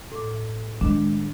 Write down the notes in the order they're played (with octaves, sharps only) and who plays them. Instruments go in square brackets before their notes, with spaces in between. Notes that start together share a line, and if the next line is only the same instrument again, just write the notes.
[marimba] A2 D6
[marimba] D#3 D4 [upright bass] G#3